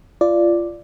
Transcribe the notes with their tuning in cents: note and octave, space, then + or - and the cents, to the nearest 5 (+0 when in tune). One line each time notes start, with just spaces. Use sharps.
F4 -25 D5 +0